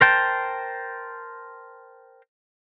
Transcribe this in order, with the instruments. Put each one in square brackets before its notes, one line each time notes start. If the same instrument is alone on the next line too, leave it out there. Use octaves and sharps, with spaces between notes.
[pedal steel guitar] A#4 C5 G5 A5